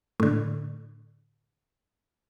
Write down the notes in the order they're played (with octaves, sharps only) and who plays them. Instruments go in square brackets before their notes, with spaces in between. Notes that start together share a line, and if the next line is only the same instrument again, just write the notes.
[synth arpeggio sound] A2 D3